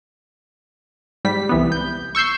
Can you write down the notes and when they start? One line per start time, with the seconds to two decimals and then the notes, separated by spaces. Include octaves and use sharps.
1.25 G#2 G3 B6
1.49 C2 E3 B3
1.72 G6
2.15 C#6 E6 G6 C7